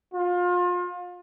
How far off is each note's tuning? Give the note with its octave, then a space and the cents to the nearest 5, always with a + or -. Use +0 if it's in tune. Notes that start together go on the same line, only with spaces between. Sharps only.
F4 +30